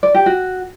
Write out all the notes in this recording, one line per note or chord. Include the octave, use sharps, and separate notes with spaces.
D5
G4
F#4